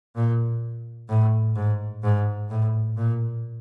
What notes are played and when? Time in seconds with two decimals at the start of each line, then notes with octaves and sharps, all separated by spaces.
0.16 A#2
1.09 A2
1.56 G#2
2.03 G#2
2.50 A2
2.97 A#2